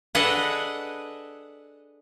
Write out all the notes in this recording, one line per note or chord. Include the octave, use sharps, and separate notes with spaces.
D4 G#4 A4 B4 D#5 F#5